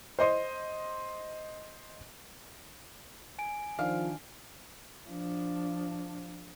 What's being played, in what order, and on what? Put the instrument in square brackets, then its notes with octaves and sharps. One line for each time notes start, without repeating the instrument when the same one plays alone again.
[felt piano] C5 D#5 C6
[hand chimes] G#5 D7
[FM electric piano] D#3 D4 [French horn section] F3 [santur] F5
[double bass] F3 D4